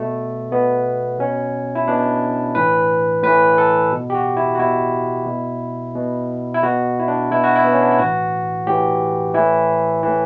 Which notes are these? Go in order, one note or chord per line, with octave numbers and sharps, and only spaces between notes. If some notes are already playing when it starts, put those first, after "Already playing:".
Already playing: B2 A3
B2 B3
B2 C#4
E4
B2 D4
A2 E3 B4
A2 E3 B4
A4
B2
G4
F#4
E4
F#4
B2 E4
B2
B2
E4
B2 F#4
E4
D4
B2 E4
F#4
E4
B3
C#4
D4
E4
A2 E3 F#4
A2 E3 G4
A2 E3 E4
A2 E3